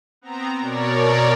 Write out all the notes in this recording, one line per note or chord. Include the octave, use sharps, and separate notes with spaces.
B3 C4 A#5
B2 A#4 C#5 D5